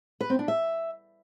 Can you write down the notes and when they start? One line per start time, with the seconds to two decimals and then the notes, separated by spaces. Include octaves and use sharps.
0.20 B4
0.30 C4
0.39 D4
0.48 E5